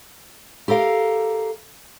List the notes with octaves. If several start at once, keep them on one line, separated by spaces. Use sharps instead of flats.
G4 A4 A#4 F5